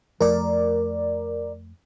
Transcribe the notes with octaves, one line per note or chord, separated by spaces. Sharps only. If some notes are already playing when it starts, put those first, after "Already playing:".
F2 F3 A3 A#4 D5